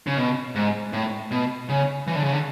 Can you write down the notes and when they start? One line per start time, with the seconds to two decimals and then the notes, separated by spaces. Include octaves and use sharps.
0.07 C#3
0.17 B2
0.55 G#2
0.93 A2
1.31 B2
1.69 C#3
2.07 E3
2.16 D3
2.24 C#3
2.33 D3